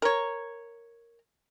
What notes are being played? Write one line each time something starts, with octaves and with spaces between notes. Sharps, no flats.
A#4 C#5